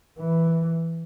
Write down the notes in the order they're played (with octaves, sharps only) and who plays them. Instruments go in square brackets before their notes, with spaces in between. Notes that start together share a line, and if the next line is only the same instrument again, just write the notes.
[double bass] E3